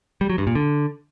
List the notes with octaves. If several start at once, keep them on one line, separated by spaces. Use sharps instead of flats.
G3
F#3
G2
A#2
D3